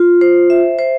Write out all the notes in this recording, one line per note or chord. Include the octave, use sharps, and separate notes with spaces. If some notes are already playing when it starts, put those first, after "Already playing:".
Already playing: F4
C5
E5
C5